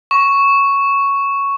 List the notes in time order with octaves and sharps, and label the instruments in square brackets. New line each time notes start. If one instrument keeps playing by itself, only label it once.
[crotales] C#6